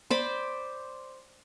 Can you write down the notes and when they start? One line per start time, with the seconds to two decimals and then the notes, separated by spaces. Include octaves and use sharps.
0.10 C5 D5 B5